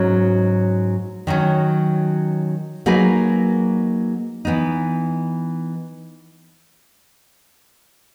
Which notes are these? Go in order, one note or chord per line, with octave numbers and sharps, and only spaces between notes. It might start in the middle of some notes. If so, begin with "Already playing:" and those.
Already playing: G#2 F#3 C#4
D#3 F#3 C#4
F#3 A#3 D#4 G#4 B4
E3 B3 D#4